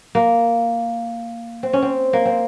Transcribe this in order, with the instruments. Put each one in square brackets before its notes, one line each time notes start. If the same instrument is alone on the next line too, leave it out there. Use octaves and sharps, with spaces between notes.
[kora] A#3
C4
C#4
C4
A#3
C4